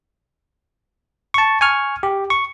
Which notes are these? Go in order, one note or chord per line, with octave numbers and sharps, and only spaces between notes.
A5 C#6
G#5 C#6 F6
G4
C#6